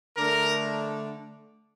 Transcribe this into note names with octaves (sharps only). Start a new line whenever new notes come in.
D3 A3 D4 A#4